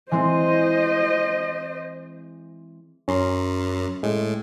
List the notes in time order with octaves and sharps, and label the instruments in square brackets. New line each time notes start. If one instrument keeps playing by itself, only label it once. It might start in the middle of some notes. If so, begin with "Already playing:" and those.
[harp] E3 G#3 C4 [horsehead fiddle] C5 D#5
[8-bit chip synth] F#2 [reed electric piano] C#4 A#5 C6
[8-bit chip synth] A2 [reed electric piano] G#3